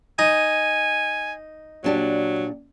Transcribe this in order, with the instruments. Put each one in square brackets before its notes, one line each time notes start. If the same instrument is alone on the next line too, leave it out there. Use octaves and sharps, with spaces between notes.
[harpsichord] D#4 [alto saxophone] G#5
[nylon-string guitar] A#2 D4 G4 [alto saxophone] F#3